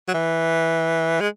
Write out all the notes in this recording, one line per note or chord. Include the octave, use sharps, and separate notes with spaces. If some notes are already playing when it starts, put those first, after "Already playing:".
F#3
E3
G#3